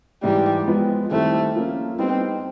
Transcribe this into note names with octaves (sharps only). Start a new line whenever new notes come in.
G#2 E3 G3 G#3
F3 G#3 B3
D#3 G3 A3 C4 E4
F3 A#3 C#4
G3 B3 C4 D#4